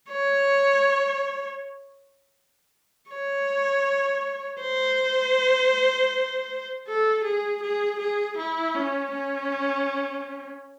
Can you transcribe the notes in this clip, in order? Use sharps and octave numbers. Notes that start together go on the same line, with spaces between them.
C#5
C#5
C5
A4
G#4
G#4
G#4
E4
C#4
C#4